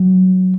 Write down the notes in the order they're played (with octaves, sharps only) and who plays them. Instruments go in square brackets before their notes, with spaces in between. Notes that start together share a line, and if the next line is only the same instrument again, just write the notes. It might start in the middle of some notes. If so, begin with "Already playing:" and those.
Already playing: [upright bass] F#3